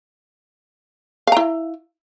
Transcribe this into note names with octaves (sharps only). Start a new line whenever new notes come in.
E4 F5 A#5